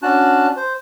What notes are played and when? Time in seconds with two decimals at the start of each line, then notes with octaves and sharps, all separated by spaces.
0.02 C#4 D4 F#4 A5 F#6
0.56 C5